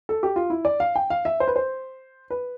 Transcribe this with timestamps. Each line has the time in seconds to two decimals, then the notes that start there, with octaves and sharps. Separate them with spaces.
0.09 A4
0.23 G4
0.36 F4
0.50 E4
0.65 D5
0.80 F5
0.96 G5
1.10 F5
1.25 E5
1.40 C5
1.48 B4
1.56 C5
2.30 B4